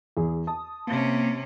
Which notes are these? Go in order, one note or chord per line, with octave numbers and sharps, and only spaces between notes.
E2 G#4
A5 D#6
C3 A#3 C#4